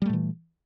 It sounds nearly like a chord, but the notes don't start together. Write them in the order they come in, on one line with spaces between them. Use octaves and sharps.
G3 A3 A#2 E3